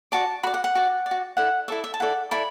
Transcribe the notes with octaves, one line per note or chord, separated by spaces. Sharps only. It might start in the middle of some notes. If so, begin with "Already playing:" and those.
F#4 D5 A5
F#4 D5 B5
F#5
F#5
F#4 D5
D5
F#4
E4 A4 D5 F#5
E4 A4 D5 E5
E5
A5
E4 A4 D5 F#5
E4 A4 D5 B5